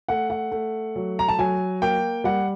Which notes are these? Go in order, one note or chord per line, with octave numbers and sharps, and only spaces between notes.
A3 F#5
F#5
A3
F#3
A#5
A5
F#3 G#5
A#3 G5
G3 F#5